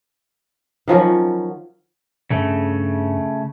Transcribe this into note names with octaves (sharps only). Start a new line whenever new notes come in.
D#3 F3 F#3 C#4
G2 C#3 A3